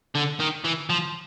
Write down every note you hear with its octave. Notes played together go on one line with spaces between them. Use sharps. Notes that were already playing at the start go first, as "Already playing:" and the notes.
D3
D#3
E3
F3